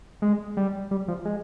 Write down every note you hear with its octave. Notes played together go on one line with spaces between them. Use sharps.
G#3
G3
G3
F3
G#3